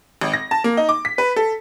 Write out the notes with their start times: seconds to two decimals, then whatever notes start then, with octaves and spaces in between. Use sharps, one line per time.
0.21 G#1
0.34 A#6
0.51 A5
0.64 A#3
0.77 D#4
0.89 D6
1.05 B6
1.18 B4
1.36 A4